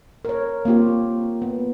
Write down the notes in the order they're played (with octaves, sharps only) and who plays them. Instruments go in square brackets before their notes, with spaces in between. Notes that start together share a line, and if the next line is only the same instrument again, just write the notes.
[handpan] A#4 C#5
A#3 C4 F4 G4
B3